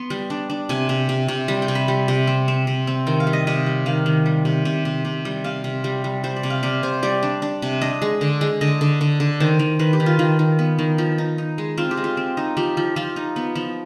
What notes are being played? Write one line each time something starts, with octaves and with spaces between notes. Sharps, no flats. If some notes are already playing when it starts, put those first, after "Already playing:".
Already playing: B3 C6
G3
D4
D4
C3 G#5
C3
C3
C3
G3
G5
C3
B5
G3
C3
C4
C4
C3
C4
D#3 G5
F5
G3
D#5
C3 D#5
G3
D#3 F5
D#3
G3
C3
C3
C3
C3
G3
C3 F5
C3
G3
G3
G3 C5
D5
C3
F5
C3 D5
C3 C5
G3 D5
D4
D4
C3
D4 D#5
G#3
D3
G#3
D3 D#5
D3
D3
D3
D#3 C5
D#3
D#3 B4
G4
D#3
F4
D#3 F4
D#3
B3
D#3
F3
D#4
D#4
G#3
C4 F4
G4
G#3
F4
C4
D#4
F3 G4
F3
F3 F4
D#4
B3
F3